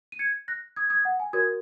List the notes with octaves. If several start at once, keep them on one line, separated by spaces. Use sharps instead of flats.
D#7
G#6 C#7
F#6 A#6
D#6 G#6
D#6 G#6
F#5
G#5
F#4 A#4 C#5 D#6 G#6